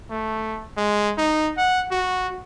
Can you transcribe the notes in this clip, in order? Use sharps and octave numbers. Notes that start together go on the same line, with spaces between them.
A3
G#3
D#4
F#5
F#4